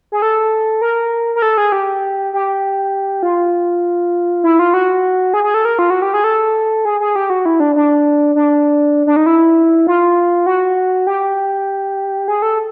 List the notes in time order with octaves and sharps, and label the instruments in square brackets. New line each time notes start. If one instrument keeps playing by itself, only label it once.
[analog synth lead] G#4
A4
A#4
A#4
A4
G#4
G4
G4
F4
E4
F4
F#4
G#4
G#4
A4
A#4
F4
F#4
G4
G#4
A4
G#4
G#4
G4
F#4
E4
D4
D4
D4
D4
D#4
E4
F4
F#4
G4
G#4
A4